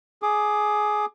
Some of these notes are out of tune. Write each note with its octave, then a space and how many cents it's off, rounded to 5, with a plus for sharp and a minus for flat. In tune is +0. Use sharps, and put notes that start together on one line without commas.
G#4 +15 D6 +25